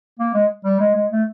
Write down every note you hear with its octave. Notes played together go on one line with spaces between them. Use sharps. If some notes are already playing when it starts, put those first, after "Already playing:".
A#3
G#3
G3
G#3
G#3
A3